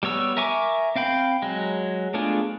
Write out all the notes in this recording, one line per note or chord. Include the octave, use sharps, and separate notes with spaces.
G3 B3 C#5 E6
A#4 E5 G#5 C#6 D6
C4 F5 G5 B5
F#3 G#3
A3 B3 D4 F4 G#4